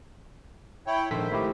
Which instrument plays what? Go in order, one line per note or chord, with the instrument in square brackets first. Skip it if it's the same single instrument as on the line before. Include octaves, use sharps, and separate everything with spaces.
[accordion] E4 C#5 G5
[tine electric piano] A#1 A4 B6 [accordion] G#2 D#3 C5
[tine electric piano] A3 E4 G4